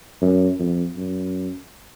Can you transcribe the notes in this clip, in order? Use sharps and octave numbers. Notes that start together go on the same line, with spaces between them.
F#2
F2
F#2